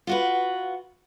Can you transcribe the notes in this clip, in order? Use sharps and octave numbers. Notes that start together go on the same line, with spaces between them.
F4 F#4 B4